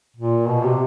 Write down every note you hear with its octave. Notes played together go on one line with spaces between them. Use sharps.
A#2
B2
C3